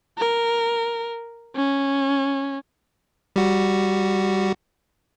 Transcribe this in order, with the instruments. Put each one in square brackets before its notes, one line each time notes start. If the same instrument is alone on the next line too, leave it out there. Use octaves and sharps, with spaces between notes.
[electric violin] A#4
C#4
[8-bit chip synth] G3 F#4